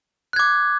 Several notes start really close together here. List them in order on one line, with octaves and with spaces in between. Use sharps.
F#6 G#6 D6